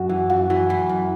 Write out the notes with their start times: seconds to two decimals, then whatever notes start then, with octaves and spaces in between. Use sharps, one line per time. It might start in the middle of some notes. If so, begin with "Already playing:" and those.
Already playing: F#2 F#4
0.09 E3
0.30 F#2 F#4
0.50 E3
0.70 E3
0.89 F#2